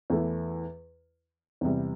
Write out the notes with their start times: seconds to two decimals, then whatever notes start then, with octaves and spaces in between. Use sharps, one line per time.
0.10 E2 E3 A3 E4
1.61 E2 C3 G3